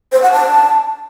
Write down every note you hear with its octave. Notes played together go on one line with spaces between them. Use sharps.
C5
F#5
A5